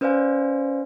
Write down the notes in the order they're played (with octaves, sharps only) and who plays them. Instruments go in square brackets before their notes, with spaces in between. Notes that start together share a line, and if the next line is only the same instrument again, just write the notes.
[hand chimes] C#4 B4 C5 D5 F5 G#5